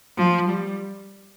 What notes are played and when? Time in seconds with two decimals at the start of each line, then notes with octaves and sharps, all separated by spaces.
0.17 F3
0.49 G3